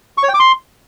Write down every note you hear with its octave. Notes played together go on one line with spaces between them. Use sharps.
C#6
C#5
G5
D6
C6